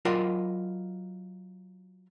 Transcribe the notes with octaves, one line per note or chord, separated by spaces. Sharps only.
F#3 F4 A#4 D5 D#5